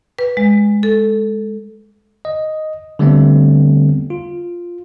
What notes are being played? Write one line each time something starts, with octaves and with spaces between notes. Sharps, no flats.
B4
G#3
A4
D#5
D3 G3 A3 B3 C4
F4